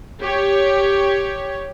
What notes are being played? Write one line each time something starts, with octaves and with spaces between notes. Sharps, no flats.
G4 C#5